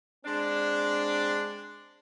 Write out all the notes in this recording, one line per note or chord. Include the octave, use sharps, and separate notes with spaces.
G#3 C4 D4